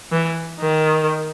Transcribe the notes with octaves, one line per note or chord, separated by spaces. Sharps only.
E3
D#3